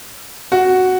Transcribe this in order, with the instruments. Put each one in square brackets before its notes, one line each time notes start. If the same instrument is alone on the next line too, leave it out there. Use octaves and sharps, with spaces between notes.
[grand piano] F#4